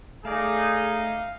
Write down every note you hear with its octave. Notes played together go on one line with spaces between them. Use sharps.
A3 D#4 G#4 D5 F5